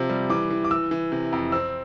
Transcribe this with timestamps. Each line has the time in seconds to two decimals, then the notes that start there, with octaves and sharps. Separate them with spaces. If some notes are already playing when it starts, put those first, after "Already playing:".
Already playing: C3 F3
0.09 G3
0.30 E3 D6
0.50 E3
0.64 D6
0.71 E3 E6
0.91 E3
1.12 C3
1.33 F2
1.52 C4 E6